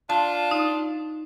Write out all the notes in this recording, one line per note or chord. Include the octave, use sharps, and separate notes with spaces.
D4 F4 A5
D#4